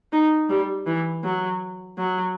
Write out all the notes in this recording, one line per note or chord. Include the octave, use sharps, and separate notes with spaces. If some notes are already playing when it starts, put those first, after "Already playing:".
D#4
G3
E3
F#3
F#3